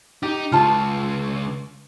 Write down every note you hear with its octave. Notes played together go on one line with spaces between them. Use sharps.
D#4 G4
C#2 F4 A5